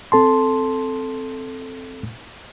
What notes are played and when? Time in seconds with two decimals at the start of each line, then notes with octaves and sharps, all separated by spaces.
0.12 C4 A4 A5 C6